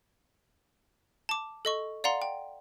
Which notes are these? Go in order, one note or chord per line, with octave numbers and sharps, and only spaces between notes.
A5 D6
A4 D#5 C#6
D5 F5 F#5 A#5 C6
G5